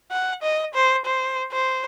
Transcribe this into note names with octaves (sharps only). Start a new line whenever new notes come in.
F#5
D#5
C5
C5
C5